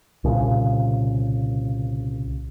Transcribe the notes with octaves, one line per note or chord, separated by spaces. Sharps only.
C2 A#2 C#3